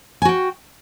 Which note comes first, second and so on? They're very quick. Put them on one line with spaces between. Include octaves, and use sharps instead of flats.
G#5 F#4 G5